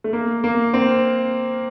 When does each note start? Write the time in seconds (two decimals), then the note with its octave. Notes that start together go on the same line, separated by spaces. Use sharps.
0.04 A3
0.13 A#3
0.44 A#3
0.74 C4